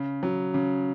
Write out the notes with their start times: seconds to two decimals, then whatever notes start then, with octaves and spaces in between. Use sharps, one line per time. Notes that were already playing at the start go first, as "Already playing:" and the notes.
Already playing: C#3
0.23 F#3
0.54 C#3